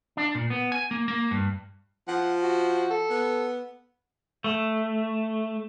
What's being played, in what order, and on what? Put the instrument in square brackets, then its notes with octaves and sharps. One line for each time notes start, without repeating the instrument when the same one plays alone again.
[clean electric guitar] D4
A#2
B3
G#5
A#3
A#3
G2
[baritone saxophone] F3 [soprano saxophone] F#5
[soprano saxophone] F#4
A4
[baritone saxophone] B3
[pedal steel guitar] A3